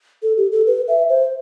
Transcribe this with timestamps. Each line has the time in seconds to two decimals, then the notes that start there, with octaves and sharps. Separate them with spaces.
0.23 A4
0.37 G4
0.52 A4
0.66 B4
0.88 E5
1.09 C5